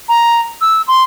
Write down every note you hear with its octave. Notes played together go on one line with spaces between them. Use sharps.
A#5
E6
C6